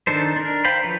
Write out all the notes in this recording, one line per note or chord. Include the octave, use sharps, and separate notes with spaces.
D#3 D4 D#4 A4 C5
D4 A#4
C5 F5 G5 A#5 B5
D3 E3 F3 B4 C#5